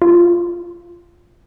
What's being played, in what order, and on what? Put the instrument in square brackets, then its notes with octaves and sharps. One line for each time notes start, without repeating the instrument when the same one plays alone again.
[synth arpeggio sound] F4